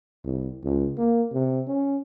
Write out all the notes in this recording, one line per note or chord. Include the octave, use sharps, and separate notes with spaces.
C2
C#2
A#3
C3
C#4